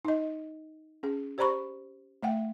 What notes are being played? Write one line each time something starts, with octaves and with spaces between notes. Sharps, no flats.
D#4 D#5
C#4 G#4
G4 C5 D5 A#5 B5 C#6
A3 E5 F#5 G5